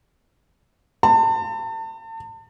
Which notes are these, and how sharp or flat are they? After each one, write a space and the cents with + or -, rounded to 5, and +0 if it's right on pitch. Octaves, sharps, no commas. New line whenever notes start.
A5 +35